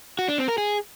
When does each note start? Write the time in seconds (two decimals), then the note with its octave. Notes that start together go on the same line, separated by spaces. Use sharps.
0.19 F#4
0.28 D4
0.38 C4
0.48 A#4
0.58 G#4